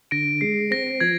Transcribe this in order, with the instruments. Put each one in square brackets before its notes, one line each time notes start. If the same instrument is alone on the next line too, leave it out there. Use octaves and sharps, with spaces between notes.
[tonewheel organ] D3 [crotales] A#6 D7
[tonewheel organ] G#3 [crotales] C7
[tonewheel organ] C4 [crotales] A#6
[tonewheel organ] F3 [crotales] G#6